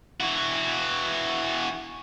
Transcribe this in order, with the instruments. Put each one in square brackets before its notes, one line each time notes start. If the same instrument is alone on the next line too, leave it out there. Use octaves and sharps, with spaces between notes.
[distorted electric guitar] E3 F#4